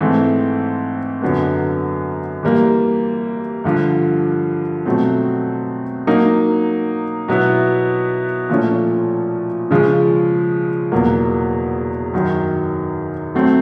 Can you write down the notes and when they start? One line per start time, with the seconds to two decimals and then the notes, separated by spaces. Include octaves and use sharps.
0.01 G#2 E3 A3 C4
1.22 F#2 D3 F#3 B3
2.43 E3 G3 A#3
3.64 G2 D3 F3
4.85 B2 F#3 A3 C4
6.07 F#3 A#3 D#4
7.28 B2 F#3 B3 E4
8.50 A#2 F3 A3 C#4
9.71 C#3 F3 G#3
10.92 E2 B2 F#3 A#3
12.13 F#2 D#3 F#3
13.35 F#3 A3 C4